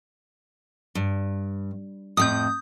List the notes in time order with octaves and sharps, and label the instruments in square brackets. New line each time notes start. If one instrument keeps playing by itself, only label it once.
[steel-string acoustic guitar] G2
[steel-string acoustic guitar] F2 A2 [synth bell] D#6 G6